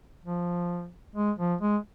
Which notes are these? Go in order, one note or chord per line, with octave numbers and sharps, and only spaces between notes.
F3
G#3
F3
G#3